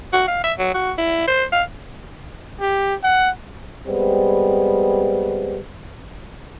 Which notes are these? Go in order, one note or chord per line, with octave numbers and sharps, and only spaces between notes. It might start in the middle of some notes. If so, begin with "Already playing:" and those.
F#4
F5
E5
F#3
F#4
E4
C5
F5
G4
F#5
G3 G#3 B3 C4